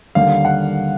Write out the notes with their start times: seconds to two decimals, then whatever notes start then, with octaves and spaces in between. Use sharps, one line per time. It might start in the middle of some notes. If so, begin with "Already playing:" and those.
0.15 D#2 D3 G3 A#3 F5
0.45 F#5